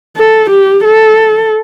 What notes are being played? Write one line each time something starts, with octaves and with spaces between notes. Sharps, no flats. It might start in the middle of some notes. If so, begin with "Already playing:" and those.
A4
G4
A4